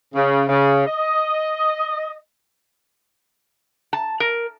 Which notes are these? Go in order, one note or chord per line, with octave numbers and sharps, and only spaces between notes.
C#3
C#3
D#5
A5
A#4